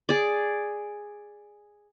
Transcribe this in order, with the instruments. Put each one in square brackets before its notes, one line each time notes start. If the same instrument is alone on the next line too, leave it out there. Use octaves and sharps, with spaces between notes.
[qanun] G#4 D5